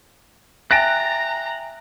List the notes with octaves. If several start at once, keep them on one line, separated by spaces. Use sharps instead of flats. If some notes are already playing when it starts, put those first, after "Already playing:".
E5 G5 G#5 A#5 F#6 A6 A#6 D7